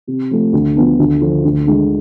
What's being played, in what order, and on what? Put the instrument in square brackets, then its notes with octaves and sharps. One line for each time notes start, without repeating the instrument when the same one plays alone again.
[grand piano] C3
F3 A3
D2
D3 F3 B3 D4
D2
D3 F3
D2
D3 G#3 D4